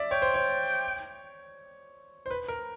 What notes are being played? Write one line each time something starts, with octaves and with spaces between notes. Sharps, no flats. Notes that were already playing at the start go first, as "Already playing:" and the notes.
Already playing: D5 E5
C#5 G5
C5
C#5
C5
B4
A#4